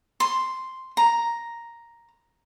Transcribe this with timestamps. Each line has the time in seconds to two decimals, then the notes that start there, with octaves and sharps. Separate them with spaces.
0.20 C6
0.97 A#5